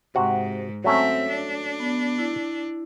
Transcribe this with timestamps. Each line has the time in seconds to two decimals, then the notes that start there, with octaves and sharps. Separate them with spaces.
0.15 G#2 C3 F#4 F#5
0.84 F#3 A3 C4 C#4 E5
1.29 D4
1.80 B3
2.19 E4